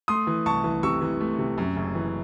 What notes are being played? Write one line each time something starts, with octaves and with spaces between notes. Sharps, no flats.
A3 C6 D#6
E3
C2 A5 C#6
E3
C3 C#6 E6
E3
A3
C3
F#2
F#1
E3